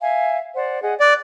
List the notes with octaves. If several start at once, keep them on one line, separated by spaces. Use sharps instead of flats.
E5 F5 G#5
C5 D5 F#5
G#4 D#5 F#5
D5 F#6